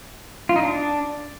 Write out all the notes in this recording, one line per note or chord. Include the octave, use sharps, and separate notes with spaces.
F4
D#4
D4